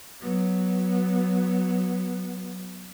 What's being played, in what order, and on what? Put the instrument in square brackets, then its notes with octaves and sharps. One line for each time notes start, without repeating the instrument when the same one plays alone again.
[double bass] F#3 B3